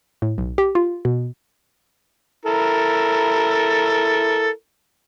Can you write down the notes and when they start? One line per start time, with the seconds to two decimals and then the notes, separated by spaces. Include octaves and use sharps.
0.22 A2
0.38 B1
0.58 G4
0.75 F4
1.05 B2
2.45 E4 A4 A#4